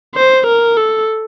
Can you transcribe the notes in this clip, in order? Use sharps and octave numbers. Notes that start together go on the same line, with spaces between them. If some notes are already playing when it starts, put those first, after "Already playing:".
C5
A#4
A4